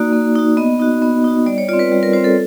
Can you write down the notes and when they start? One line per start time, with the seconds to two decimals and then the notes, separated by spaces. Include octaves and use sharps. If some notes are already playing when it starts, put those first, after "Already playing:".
Already playing: A#3 D#4 F#4 D5
0.12 A#3
0.36 D#4 F#4
0.57 B3 D#5
0.79 D#4 F#4
1.02 B3
1.24 D#4 F#4
1.46 G3 D5
1.58 C#5
1.68 C4 F4 D5
1.79 B4
1.92 G3
2.03 A#4
2.13 C4 F4 C5
2.24 A4